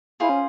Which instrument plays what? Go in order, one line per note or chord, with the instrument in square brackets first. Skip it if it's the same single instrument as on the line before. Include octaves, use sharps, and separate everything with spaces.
[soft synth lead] E4 [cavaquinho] F4 G#4 C5
[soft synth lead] C#4